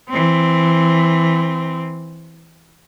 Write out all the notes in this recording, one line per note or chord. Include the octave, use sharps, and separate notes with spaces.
E3 C4